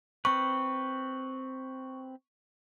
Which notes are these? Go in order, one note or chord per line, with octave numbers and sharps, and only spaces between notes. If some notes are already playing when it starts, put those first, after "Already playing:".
C4 B4 C#6